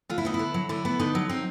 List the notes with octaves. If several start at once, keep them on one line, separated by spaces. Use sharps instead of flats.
D3 F4
E4
B3 D#4
E4
D3
F#3
D3 E4
B3
D3 D#4
F#3
C4 D#4